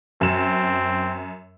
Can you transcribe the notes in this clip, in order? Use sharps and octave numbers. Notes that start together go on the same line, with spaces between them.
F#2 C4 E7